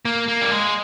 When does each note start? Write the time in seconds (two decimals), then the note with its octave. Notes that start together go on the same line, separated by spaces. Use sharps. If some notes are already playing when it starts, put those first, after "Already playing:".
0.05 A#3
0.28 A#3
0.41 G3
0.51 G#3